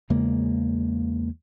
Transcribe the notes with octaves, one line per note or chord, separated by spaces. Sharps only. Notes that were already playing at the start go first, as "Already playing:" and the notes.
E2 C#3 G#3 A#3